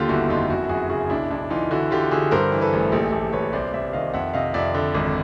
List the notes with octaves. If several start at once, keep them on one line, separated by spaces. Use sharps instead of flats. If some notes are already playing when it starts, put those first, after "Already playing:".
Already playing: D#2 D3 F4 G4
G1 E4 F#4
F2 D#4 F4
F#2 E4 F#4
F#2 F#4 G#4
C#3 F#4 G#4
B1 D4 E4
B1 D4 E4
E3 D#4 F4
D3 E4 F#4
D3 F4 G4
D3 F#4 G#4
G2 A#4 C5
E3
A4 B4
A1
A#1 G4 A4
A#1
A#1 B4 C#5
C2 C5 D5
C2 D5 E5
D#3 D#5 F5
F2 E5 F#5
C3 D#5 F5
F2 D5 E5
D3
G#1